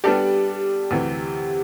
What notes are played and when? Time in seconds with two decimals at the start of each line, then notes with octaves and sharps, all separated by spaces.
0.04 G3 B3 D4 G4 A4 D5
0.91 D2 C3 E3